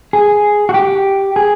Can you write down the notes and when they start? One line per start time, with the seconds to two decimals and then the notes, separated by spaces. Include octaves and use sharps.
0.13 G#4
0.69 F#4
0.74 G4
1.36 G#4